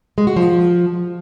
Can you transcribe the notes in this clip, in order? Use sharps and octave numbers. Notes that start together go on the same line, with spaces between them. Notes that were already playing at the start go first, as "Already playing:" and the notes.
G#3
F#4
F3